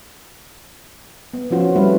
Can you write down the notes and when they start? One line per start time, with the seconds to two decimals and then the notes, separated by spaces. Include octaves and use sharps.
1.34 B3
1.51 F3 C#4 F4 F#4
1.76 G3 A3 C4 E4 B4 F5